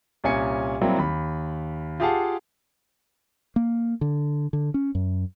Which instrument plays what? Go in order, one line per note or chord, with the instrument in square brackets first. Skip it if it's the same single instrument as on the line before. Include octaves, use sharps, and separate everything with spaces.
[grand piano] C2 A#2 C#4 G#5 C#7
F#3 G3 A#3 C4 E4
D#2 B5
F4 G4 G#4 F5 F#5 A5
[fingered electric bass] A#3
D3
D3
C#4
F#2